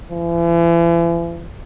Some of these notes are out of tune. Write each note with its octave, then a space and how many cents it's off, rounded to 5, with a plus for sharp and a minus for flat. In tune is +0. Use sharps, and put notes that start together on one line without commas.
E3 +40